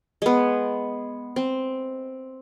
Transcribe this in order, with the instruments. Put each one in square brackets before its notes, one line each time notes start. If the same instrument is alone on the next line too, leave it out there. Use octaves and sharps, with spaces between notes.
[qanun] G#3 B3
C4